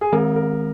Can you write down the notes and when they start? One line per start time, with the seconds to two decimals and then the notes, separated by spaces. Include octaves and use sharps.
0.01 G#4
0.12 D#3 G#3 C4 A#4
0.36 A#4